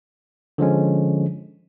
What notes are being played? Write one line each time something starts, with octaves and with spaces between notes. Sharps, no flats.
D3 F3 G#3 C#4